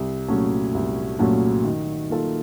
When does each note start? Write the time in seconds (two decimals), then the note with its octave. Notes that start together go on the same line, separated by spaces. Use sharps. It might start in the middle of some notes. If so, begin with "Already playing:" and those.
Already playing: C2
0.28 A#2 F#3 A3 C#4
0.74 C2
1.19 A#2 F#3 A3 C#4
1.65 D#3
2.10 A#3 F4 A4